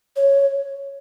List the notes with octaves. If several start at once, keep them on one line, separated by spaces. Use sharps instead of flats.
C#5